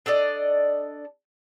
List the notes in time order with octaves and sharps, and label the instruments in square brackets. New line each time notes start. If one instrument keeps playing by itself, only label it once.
[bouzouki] D4 A4 D5 D#5